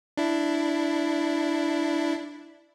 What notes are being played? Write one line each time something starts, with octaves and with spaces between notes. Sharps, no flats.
D4 E4